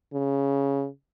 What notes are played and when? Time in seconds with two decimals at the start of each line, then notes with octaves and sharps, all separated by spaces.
0.13 C#3